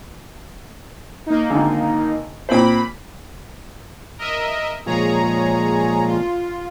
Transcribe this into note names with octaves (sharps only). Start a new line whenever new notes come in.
A#3 D#4
G#1 D3
A#2 C4 C5 B5
A#4 D#5 E5
A#2 F3 G#3 G#4 C#5 A#5
F4